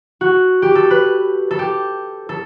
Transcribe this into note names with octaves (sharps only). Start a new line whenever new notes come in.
F#4
G4
A4
B4
A4
G4
A4